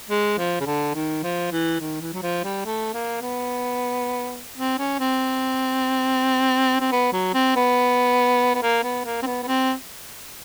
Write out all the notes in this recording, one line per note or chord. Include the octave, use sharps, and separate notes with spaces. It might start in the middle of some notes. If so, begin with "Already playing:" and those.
G#3
F3
C#3
D3
D#3
F3
E3
D#3
E3
F#3
F3
G3
A3
A#3
B3
C4
C#4
C4
C4
B3
F#3
C4
B3
B3
A#3
B3
A#3
C4
B3
B3
C4